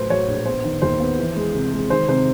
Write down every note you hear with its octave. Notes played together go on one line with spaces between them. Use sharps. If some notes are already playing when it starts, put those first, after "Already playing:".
Already playing: A2 F#3 B4 C5
F#3 C#5
A#1
B3 C5
D#3
D#2 C5
B3
E3
G#3
C3
G#3
D#3 C5
C3 C5